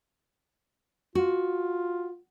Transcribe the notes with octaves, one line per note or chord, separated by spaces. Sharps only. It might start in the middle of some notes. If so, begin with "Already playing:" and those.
F4 F#4